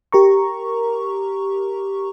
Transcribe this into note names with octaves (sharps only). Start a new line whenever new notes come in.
G4 A#4 A#5 C#6